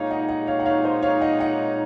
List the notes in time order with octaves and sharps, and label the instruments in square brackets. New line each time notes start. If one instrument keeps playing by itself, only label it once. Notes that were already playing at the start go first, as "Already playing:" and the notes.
Already playing: [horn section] A#2 G#3 D#4 [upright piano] C#5 F5
[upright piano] D#5 F#5
D#5 F#5
C#5 F5
F#5
C#5 F5
C5 D#5
C#5 F5
D#5 F#5
D#5 F#5